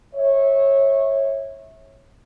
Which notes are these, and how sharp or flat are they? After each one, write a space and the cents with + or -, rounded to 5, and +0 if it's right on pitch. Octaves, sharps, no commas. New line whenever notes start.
C#5 -20 E5 -20